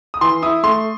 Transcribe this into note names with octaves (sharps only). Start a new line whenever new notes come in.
D#6
E3 C6
E4 D#6
A3 C6